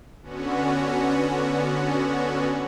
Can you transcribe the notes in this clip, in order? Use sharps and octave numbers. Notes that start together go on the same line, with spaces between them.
D3 B3 C#4 F#4